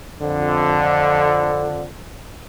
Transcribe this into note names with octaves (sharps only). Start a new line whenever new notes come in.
F2 D3